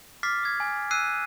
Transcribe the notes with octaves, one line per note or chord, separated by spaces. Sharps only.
D6 F6 A6 B6 C7
D#6 G#6
G#5
E6 F#6 C7 D#7